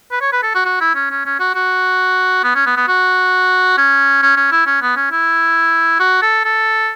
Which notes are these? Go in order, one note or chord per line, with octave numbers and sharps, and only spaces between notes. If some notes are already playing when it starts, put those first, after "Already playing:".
B4
C#5
B4
A4
F#4
F#4
E4
C#4
C#4
C#4
F#4
F#4
B3
C#4
B3
B3
F#4
C#4
C#4
C#4
E4
C#4
B3
C#4
E4
F#4
A4
A4